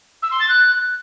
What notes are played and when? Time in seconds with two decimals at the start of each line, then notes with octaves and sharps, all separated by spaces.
0.22 E6
0.31 C6
0.39 A6
0.48 F#6